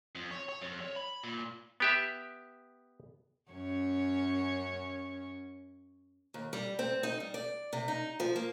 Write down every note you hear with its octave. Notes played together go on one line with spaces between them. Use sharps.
F2
C#5
C#5
F2
C#5
B5
A#2
B3 G4 E5
F#2 C#4 C#5
D#2
G3
C4
D#4
G3
D5
C3
D#4
F3
A#3